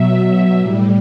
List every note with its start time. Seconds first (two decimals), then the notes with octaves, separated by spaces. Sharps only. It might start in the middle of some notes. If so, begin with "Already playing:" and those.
Already playing: B2 F#3 E5
0.59 A2 G3